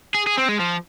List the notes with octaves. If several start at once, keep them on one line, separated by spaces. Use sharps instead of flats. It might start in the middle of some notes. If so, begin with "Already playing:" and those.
G#4
G#4
C4
G#3
F3